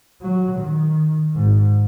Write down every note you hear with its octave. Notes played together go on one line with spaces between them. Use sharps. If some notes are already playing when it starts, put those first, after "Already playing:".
F#3
D#3
G#2